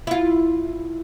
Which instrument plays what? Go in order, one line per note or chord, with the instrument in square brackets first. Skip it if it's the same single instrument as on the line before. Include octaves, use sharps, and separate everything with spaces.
[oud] E4 F4